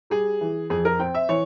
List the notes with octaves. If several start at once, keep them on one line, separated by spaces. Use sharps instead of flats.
G3 G#4
E3
F2 G#4
A#4
C4 G5
E5
E3 C#5